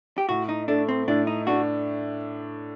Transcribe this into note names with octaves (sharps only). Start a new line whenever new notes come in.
G4
A2 F#4
D#4
A3 D4
C4
A2 D4
D#4
D4 F#4